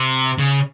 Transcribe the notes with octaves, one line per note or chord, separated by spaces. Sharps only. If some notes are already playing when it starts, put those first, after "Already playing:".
Already playing: C3
C#3